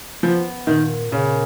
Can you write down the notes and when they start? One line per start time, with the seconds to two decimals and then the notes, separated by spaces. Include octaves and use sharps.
0.23 F3 B3
0.67 A#2 D#3
1.11 A#2 C#3